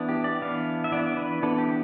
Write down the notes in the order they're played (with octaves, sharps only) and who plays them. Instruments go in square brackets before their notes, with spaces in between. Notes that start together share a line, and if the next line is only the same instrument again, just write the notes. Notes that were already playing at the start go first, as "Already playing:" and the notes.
Already playing: [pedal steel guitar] E3 B3 D4
G4
D5
E3 B3 D4 F5
E5
E3 B3 D4 D5
B4
E3 B3 D4 A4
G4